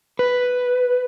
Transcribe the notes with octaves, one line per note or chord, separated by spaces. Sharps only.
B4